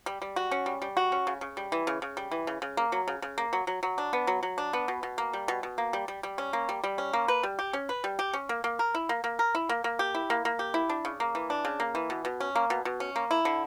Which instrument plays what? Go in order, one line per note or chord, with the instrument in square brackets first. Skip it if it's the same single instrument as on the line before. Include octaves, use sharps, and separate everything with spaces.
[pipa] G3
G3
F#4
C#4
G3
G3
F#4
C#4
C#3
C#3
G3
E3
C#3
C#3
G3
E3
C#3
C#3
A#3
F#3
C#3
C#3
A#3
F#3
F#3
F#3
D4
B3
F#3
F#3
D4
B3
B2
B2
A#3
G3
B2
B2
A#3
G3
G3
G3
C#4
A#3
G3
G3
C#4
A#3
B4
G3
G4
C#4
B4
G3
G4
C#4
A#3
A#3
A#4
E4
A#3
A#3
A#4
E4
A#3
A#3
G4
E4
A#3
A#3
G4
E4
D4
C#3
A#3
E3
D4
C#3
A#3
E3
B2
B2
C#4
A#3
B2
B2
C#4
A#3
E4
D3